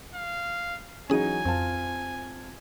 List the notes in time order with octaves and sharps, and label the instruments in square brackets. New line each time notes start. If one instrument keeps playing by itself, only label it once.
[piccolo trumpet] F5
[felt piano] E3 F#3 D#4 [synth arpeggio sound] C#4 G#4 D#7 [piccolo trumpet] G#5
[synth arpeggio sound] F2 [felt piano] C4 F4 A5